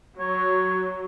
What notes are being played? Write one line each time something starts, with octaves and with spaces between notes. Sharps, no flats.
F#3 C#5